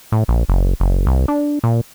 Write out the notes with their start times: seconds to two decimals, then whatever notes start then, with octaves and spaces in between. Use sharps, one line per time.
0.12 A2
0.28 A#1
0.49 F#1
0.80 F#1
1.07 C2
1.28 D4
1.64 A#2